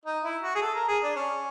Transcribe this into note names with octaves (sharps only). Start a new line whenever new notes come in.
D#4
E4
F#4
G#4
A4
A#4
G#4
D4
C#4